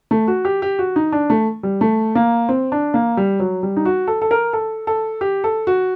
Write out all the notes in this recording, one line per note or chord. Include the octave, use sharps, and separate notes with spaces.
A3
F#4
G4
G4
F#4
D#4
D4
A3
G3
A3
A#3
C4
D4
A#3
G3
F#3
G3
D#4
F#4
A4
A4
A#4
A4
A4
G4
A4
F#4